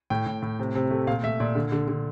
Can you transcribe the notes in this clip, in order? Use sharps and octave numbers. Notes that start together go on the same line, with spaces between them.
A2 G5
A2
A2
C3
C3
A3
A#2 F5
A3 E5
A#2 D5
D3
D3
D3